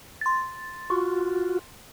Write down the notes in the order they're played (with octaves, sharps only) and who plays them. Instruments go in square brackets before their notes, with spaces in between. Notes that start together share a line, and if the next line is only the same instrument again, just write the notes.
[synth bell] C6 A6
[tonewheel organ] F4 F#4